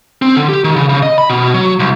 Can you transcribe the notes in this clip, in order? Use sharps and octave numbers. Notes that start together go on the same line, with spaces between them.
C4
D3
G4
D#3
C#3
C#3
D#5
B5
B2
F#3
C2